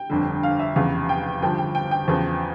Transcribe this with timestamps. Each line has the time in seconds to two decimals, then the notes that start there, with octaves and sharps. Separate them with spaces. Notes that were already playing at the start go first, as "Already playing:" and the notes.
Already playing: G5
0.10 G1 F2 D3
0.43 F5
0.59 E5
0.75 F1 E2 C#3 F5
1.09 G5
1.42 G1 G2 F3 G5
1.58 G5
1.75 G5
1.91 G5
2.08 E2 C#3 F3